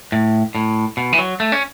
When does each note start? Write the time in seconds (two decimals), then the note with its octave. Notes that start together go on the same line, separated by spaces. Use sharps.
0.12 A2
0.55 A2
0.97 B2
1.13 E3
1.18 F#3
1.40 A3
1.52 C#4